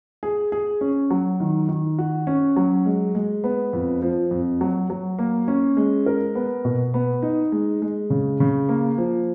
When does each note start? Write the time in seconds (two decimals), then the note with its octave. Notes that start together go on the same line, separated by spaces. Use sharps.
0.23 G#4
0.52 G#4
0.81 C#4
1.11 F#3
1.40 D#3
1.69 D#3
1.98 F#4
2.27 C#4
2.56 F#3
2.86 G#3
3.15 G#3
3.44 B3
3.73 F2
4.02 F3
4.31 F2
4.61 F#3
4.90 F#3
5.19 A#3
5.48 C#4
5.77 G#3
6.06 A#4
6.35 B3
6.65 B2
6.94 B3
7.22 D#4
7.52 G#3
7.82 G#3
8.10 C#3
8.40 C#3
8.69 A#3
8.98 F3